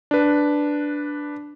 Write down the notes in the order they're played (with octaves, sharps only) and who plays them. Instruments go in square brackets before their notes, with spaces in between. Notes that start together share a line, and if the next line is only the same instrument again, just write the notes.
[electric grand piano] D4 B4